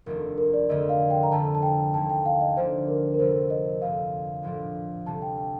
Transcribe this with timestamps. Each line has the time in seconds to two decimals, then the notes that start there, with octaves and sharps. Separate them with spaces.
0.06 F1 D#2 D#3 A3 D4 A#4
0.38 A#4
0.53 D5
0.69 F2 D3 A3 D#5
0.89 F5
1.10 G5
1.23 A#5
1.32 F2 D3 A3 A5
1.55 A5
1.62 G5
1.94 D#2 D3 F3 A5
2.10 G5
2.26 F5
2.41 D#5
2.56 D2 D3 F3 A#3 D4 C5
2.88 A#4
3.14 A#4
3.19 F2 C3 F3 A3 C5
3.50 D#5
3.81 G1 F2 D3 A3 F5
4.43 A#1 A2 F3 A#3 D4
5.06 D2 C3 G3 A5
5.22 G5
5.38 G5